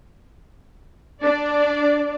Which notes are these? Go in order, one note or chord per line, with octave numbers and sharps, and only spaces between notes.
D4 D5